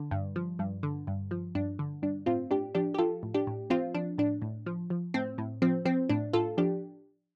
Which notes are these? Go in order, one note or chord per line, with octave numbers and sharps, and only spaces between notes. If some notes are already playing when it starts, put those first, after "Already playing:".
Already playing: D3
G2
F3
G2
D3
G2
F3
G2 D4
D3
G2 D4
A2 C4 F4
A2 D4 G4
F3 D4 G4
G4
F3 F4 A4
A2
D4 G4
A2
F3 C4 F4
F3 D4
A2 D4
A2
F3
F3
A2 C4
A2
F3 C4
F3 C4
A2 D4
A2 F4 A4
F3 D4 G4